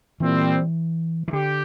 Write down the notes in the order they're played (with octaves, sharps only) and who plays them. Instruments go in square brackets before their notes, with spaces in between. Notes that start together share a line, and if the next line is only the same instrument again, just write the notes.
[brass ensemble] A#2 G3 C4 [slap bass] E3
[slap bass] E3
[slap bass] D3 [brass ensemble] G4